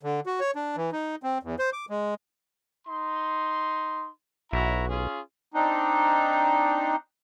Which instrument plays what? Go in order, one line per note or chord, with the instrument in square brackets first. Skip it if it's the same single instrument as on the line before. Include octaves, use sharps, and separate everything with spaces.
[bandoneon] D3
F#4
C#5
D4
E3
D#4
C4
E2
C5
D6
G#3
[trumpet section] D#4 C6
[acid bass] B1 [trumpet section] E4 F#4 A#5
[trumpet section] C#4 F4 G#4
[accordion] C4 D4 D#4